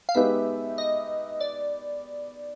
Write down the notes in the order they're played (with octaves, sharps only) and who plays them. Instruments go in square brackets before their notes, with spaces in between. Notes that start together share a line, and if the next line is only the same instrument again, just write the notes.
[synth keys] F5
[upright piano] G#3 B3 D#4 G4 B4 [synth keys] E5
[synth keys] D#5
D5